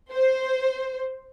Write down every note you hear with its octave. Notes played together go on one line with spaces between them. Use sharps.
C5